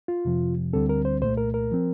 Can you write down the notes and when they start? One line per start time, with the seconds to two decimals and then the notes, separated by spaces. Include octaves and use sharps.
0.08 F4
0.25 F2 C3 F3
0.73 D2 D3 G3 C4 A4
0.89 A#4
1.05 C5
1.21 C2 A#2 A3 C5
1.38 A#4
1.54 A#4
1.72 F3 C4